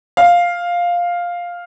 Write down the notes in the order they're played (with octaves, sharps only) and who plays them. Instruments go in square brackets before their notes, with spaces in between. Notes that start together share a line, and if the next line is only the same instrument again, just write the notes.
[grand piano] F5